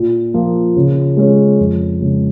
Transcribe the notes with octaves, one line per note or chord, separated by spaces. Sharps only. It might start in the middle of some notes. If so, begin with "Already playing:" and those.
Already playing: A#2
F3 A#3 F4
C#3
G#3 C#4 G#4
F2
C#3 G#3 C#4